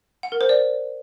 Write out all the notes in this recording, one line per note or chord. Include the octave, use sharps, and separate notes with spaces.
F#5
A#4
C5
D5